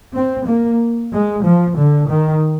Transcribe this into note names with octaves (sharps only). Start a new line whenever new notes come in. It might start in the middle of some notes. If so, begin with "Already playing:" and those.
C4
A#3
G#3
F3
D3
D#3